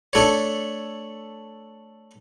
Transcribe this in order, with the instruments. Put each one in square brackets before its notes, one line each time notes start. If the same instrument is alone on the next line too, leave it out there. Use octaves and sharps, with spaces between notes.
[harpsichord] A3 D4 A4 C#5